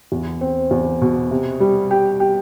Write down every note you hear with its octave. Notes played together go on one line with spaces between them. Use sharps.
E2
C4
E2
B2
C3
G3
G4
G4